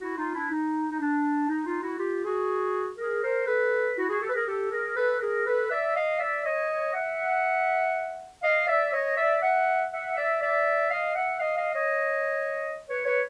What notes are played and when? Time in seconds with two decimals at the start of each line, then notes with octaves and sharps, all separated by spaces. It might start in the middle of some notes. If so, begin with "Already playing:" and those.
0.01 E4 F#4
0.17 D#4 F4
0.34 D4 E4
0.51 D#4
0.92 D#4
1.00 D4
1.49 D#4
1.66 D#4 F4
1.82 E4 F#4
1.99 F4 G4
2.24 F#4 G#4
2.98 G#4 A#4
3.24 A#4 C5
3.47 A4 B4
3.97 E4 F#4
4.09 F#4 G#4
4.22 G4 A4
4.29 B4
4.34 G#4 A#4
4.47 G4 A4
4.71 G#4 A#4
4.96 A4 B4
5.21 G#4 A#4
5.46 A4 B4
5.71 D5 E5
5.95 D#5 F5
6.20 D5 E5
6.45 C#5 D#5
6.94 E5 F#5
8.43 D#5 F5
8.67 D5 E5
8.93 C#5 D#5
9.17 D5 E5
9.42 E5 F#5
9.92 E5 F#5
10.17 D5 E5
10.42 D5 E5
10.91 D#5 F5
11.16 E5 F#5
11.40 D#5 F5
11.57 D#5 F5
11.74 C#5 D#5
12.89 B4 C#5
13.06 B4 C#5